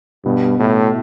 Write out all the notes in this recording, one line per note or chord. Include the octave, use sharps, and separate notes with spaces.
G2 B2
A2 E4